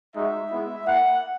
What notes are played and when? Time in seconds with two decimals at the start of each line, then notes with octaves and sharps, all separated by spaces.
0.15 G#3 D#4 F#4 E5
0.51 G#3 B3 E4
0.86 A#3 E4 F#5